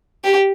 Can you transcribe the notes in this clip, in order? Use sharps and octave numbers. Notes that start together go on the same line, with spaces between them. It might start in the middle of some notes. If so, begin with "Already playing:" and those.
G4